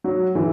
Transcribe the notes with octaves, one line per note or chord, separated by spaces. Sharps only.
F#3
E3